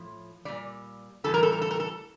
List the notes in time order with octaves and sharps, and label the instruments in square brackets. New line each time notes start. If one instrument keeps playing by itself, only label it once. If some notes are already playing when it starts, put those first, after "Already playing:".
Already playing: [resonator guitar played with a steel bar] A2 F3
A#2 G3 D5
A2 E3 G3 A4
A#4
A4
A#4
A4
A#4
A4